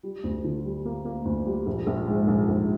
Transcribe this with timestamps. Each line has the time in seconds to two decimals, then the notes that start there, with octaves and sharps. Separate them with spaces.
0.03 G3
0.24 D2
0.44 D3
0.65 G3
0.85 A#3
1.05 A#3
1.25 D2
1.46 G3
1.66 A#1
1.87 A#1
2.07 G#2
2.28 A#1
2.49 A#1